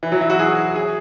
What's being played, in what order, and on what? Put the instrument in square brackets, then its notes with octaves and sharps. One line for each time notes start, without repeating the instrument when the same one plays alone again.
[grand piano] E3
F#3
E4
F#4
G#4
G#4